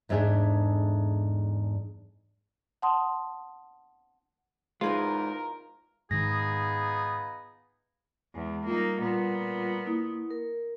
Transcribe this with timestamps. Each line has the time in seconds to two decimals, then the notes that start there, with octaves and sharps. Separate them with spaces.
0.09 E2 G#2 A3 D4 G#4 E5
2.82 F#5 A5 C6 D#6
4.81 E2 G#2 G#3 D#4 F4 G#4 A#4 B4
6.11 G#2 D#3 B3 D#4 F4 G#4 A#6
8.35 E2 G#3
8.67 G3 A#3 D#4 F4
9.00 A#2 B3
9.87 A#3 E4 D#6
10.30 A#4